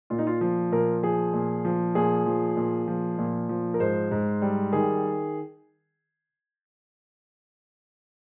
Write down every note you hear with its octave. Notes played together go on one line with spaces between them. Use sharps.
A#2 F4
D#4
F4
F3
A#2 A#4
F3 G#4
A#2
F3
A#2 G#4
F3
A#2
F3
A#2
F3
A#4
G#2 C5
G#2
G3
D#3 G#4